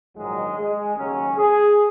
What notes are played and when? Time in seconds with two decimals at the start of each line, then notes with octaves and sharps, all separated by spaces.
0.16 A#1 G#2 D#3 F#3 G#3
0.57 G#3
0.96 D#2 C#3 F#3 C#4
1.37 G#4